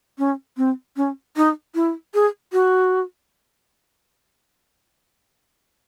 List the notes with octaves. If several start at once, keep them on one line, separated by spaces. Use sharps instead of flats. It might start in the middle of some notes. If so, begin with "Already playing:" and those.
C#4
C4
C#4
D#4
E4
G#4
F#4